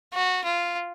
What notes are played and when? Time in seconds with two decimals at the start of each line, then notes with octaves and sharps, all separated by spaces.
0.14 F#4
0.44 F4